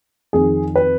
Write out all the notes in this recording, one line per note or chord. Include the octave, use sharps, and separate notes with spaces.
F2 D#3 G#4
B4